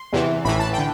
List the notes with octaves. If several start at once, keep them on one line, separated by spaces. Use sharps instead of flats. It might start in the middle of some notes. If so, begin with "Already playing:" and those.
Already playing: C6
E2 C3 E3
A1 A2 E3 B5
A5
D3 G5